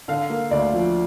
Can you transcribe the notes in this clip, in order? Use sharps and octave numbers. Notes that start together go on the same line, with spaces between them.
D3 F5
A#3
D2 D5
F3